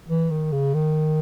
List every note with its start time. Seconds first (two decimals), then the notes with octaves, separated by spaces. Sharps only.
0.09 E3
0.31 D#3
0.52 C#3
0.74 D#3